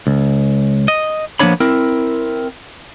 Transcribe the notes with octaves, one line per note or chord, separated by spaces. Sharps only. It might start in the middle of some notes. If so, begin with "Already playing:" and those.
C#2
D#5
F3 A#3 B3 D4 C#5 B5
C4 E4 A#4